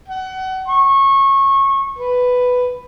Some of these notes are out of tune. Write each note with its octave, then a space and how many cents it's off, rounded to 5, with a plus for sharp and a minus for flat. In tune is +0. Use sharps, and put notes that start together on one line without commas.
F#5 +30
C#6 -25
B4 +5